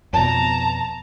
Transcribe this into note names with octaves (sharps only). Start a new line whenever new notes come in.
F2 B2 A5 A#5